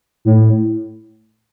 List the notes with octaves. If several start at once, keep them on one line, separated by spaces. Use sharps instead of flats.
A2